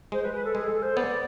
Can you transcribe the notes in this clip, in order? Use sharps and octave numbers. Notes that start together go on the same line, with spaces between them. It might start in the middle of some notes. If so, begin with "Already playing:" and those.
G#3 C5
B4
B4
A4
G#3 G#4
A4
C5
B3 D5